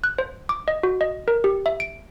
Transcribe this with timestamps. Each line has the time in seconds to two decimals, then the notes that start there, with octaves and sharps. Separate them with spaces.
0.04 F#6
0.18 C5
0.49 D6
0.68 D#5
0.83 F#4
1.01 D#5
1.28 A#4
1.44 G4
1.66 E5
1.80 D7